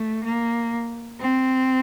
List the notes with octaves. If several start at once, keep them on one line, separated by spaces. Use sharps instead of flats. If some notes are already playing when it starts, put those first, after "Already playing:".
Already playing: A3
A#3
C4